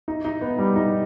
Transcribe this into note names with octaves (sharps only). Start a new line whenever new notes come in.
D#4
D#4
B3
G3
D#4